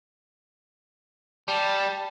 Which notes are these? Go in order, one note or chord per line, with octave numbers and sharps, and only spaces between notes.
G3 A5